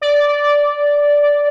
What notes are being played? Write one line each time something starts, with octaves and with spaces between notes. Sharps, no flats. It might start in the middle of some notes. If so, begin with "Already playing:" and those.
D5